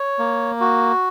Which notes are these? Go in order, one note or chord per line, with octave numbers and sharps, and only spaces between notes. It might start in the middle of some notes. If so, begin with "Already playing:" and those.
Already playing: C#5
A#3
F#4